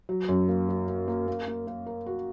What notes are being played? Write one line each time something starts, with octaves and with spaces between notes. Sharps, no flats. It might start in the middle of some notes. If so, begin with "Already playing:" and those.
F#3
F#2
A#3
F#3
A#3
A#3
A#3
A#3
A#3
A#4
F#4